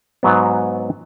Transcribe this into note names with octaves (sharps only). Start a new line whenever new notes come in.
G#2 F#3 B3